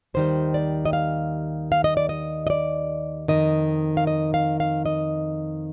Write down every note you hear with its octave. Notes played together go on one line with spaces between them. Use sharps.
D#2 D#3 G3 C5
D5
D#5
F5
F5
D#5
D5
D#5
D#5
D5
F2 C3 D#3 D#5
F5
D#5
F5
F5
D#5